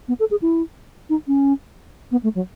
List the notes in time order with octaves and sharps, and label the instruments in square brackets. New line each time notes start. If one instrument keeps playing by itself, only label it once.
[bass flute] B3
A4
G#4
E4
D#4
C#4
B3
A3
F#3